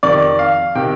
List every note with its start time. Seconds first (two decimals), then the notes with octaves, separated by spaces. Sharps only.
0.03 F2 C3 D#3 D5
0.39 F5
0.75 C3 D#3 G5